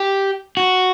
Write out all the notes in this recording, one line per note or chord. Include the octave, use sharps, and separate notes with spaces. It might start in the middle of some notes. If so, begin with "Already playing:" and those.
Already playing: G4
F#4